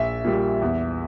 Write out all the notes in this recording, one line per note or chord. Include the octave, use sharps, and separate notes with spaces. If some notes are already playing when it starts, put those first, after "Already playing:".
Already playing: A#1 E5
A#2 G3
E2